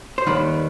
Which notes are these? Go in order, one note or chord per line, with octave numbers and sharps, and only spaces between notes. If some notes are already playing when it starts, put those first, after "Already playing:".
C5
D#2 D#3 G3 B4